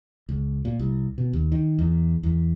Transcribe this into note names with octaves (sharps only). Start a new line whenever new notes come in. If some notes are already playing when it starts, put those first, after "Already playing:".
C#2
A#2
C2
B2
D#2
D#3
E2
E2